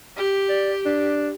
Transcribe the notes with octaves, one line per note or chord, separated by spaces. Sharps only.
G4
D5
D4